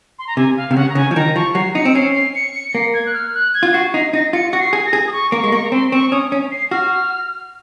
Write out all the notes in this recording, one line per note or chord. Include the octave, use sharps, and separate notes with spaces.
C6
A#5
C3 G#5
F5
C3 F5
C#3 F#5
A#5
C#3 G#5
F3
D#3 A#5
F3 C#6
F#3 C7
D#4 C#7
C4
C#4 C7
C7
C#7
C#7
A#3 C7
G#6
F#6
F6
F#6
G#6
F4
F#4 C7
D#4 C7
D#4 A#6
F4 C#7
F#4
C7
G#4
A#6
G#4
D#6
C#6
A#3 C#6
G#3
A#3 C#6
A#5
C4 C6
C4 C#6
C#4 D#6
C#4
C7
F#4 F6